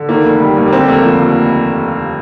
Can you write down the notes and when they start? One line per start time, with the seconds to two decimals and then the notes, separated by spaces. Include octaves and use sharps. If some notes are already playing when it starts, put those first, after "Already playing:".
Already playing: D3
0.09 D#3 A#3
0.25 F1
0.40 G3
0.57 D#2
0.68 A#3
0.72 D3 C4
0.88 F1 A#3
1.04 F3
1.20 D#2